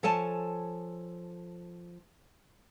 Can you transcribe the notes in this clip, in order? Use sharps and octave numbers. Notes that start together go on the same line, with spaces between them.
F3 A4 C#5 G#5 A5